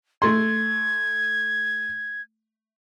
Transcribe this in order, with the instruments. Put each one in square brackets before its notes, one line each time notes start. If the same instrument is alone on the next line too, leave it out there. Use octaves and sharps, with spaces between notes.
[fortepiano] A3 C6 [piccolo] G#6